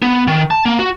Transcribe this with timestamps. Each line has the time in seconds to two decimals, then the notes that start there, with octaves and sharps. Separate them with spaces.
0.02 B3
0.28 D#3
0.51 A5
0.66 A#3
0.79 F#4